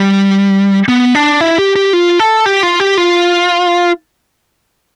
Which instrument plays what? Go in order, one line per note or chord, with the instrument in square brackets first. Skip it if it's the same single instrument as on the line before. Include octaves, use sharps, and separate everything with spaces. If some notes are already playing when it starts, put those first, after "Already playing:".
Already playing: [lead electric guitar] G3
B3
D4
E4
G4
G4
F4
A4
G4
F4
G4
F4